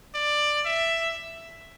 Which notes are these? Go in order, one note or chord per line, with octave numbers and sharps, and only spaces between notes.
D5
E5